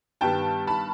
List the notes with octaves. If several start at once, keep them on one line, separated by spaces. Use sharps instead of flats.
G2 D#3 G3 B3 G5 A5
A5 B5